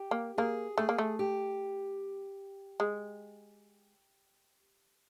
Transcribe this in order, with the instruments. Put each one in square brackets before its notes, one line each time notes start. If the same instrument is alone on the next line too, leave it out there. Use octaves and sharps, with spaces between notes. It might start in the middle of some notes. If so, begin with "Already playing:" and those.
Already playing: [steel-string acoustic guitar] G4
[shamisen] A#3
[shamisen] A#3 [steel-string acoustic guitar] G#4
[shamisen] A3 [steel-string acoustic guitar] G#4
[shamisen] A#3
A3
[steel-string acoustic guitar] G4
[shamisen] G#3